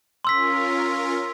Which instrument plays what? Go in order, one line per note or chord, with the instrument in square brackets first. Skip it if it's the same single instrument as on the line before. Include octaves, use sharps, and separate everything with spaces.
[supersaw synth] C#4 F4 A#4 [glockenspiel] C6 E6 B6